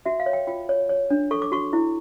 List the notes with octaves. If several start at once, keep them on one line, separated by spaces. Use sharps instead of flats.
F#4 E5
F5
C#5
G5
F4 G5
C#5
C#5
D4
A4 C#6
D6
F#4 C#6
E4